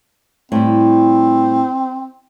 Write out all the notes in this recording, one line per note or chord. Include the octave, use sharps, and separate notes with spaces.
A2 G3 C4